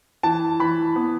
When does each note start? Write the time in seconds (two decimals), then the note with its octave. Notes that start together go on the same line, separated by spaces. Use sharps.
0.23 E3 A5
0.60 E3 B5
0.96 B3